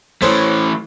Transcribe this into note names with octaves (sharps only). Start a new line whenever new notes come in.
E3 A3 C#4 G#4 C5